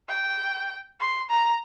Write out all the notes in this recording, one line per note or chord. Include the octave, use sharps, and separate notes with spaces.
G5
C6
A#5